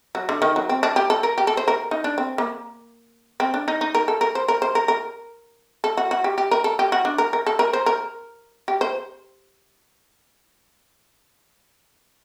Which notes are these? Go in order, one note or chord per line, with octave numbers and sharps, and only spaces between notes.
F#3
D3
D#3
F#3
C4
D4
G4
A4
A#4
G4
A4
C5
A#4
D#4
D4
C4
A#3
C4
D4
D#4
D#4
A#4
A4
A#4
C5
A#4
C5
A#4
A#4
A4
F#4
F#4
G4
G4
A#4
A4
G4
F#4
D4
A#4
A#4
A4
A#4
C5
A#4
G4
C5